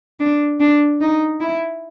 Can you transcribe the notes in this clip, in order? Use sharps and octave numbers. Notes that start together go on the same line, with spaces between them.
D4
D4
D#4
E4